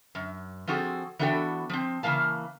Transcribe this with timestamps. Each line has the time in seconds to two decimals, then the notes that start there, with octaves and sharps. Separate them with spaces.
0.15 F#2
0.67 F3 C4 F#4 G#4 A4
1.19 E3 B3 D4 F#4 A4 G5
1.69 F3 C4
2.03 C#3 E3 A#3 F5 A5